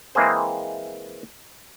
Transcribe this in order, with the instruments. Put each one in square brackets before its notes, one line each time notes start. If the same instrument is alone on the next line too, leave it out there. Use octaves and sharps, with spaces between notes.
[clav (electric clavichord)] E3 G#3 A#3 C4 G#4 C5